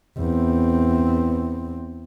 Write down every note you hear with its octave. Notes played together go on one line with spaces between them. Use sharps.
E2 C4